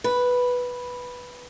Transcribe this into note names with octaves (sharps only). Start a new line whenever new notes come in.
B4